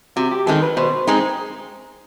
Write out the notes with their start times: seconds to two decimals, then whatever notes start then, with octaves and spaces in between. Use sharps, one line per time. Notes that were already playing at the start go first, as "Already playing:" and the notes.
0.16 C3 F#4
0.31 G4
0.46 D#3 G#3 C4 A4
0.62 B4
0.77 B2 C5
1.07 G#3 C4 D#4